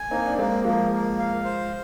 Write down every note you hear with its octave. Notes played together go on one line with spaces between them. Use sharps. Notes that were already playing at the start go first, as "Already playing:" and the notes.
Already playing: G#5
A#3 C4 D#4
D4
G#3 A#3 C4
F3 G#3 A#3
A#3
F5
C5